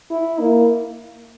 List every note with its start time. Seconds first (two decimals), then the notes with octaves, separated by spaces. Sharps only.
0.11 E4
0.40 A#3